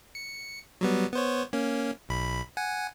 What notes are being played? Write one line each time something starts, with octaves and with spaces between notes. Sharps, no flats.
C#7
F#3 G3 B3
B3 C5 C#5
A#3 C#4
B1 B5
F#5 G#5